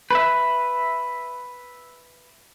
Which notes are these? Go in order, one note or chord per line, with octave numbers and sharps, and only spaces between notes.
B4 E5